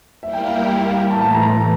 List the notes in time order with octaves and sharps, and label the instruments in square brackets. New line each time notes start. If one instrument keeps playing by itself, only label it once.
[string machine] G3 A#3 E4 G4 A#4 [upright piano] E5
[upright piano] G5
F5
E5
G5
G5
F5
G5
[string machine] A2 E3 A3 [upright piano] A5
[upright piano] A5
A#5
A#5